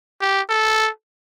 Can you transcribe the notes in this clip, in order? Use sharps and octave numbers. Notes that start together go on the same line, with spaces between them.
G4
A4